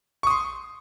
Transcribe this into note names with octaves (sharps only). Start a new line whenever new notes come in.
C6 C#6 D#6